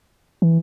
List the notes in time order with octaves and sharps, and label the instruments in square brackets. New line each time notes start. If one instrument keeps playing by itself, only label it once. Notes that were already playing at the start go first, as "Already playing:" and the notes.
[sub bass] E3